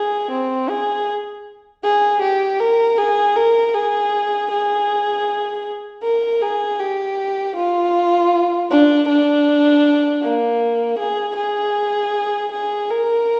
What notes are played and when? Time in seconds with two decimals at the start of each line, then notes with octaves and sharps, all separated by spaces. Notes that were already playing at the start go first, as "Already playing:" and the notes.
Already playing: G#4
0.31 C4
0.69 G#4
1.84 G#4
2.22 G4
2.60 A#4
2.98 G#4
3.36 A#4
3.74 G#4
4.51 G#4
6.03 A#4
6.42 G#4
6.80 G4
7.56 F4
8.70 D4
9.08 D4
10.23 A#3
10.99 G#4
11.37 G#4
12.52 G#4
12.91 A#4